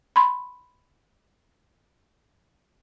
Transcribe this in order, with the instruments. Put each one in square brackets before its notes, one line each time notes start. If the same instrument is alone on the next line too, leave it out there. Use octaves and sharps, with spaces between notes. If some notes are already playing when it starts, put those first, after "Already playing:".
[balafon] B5 C6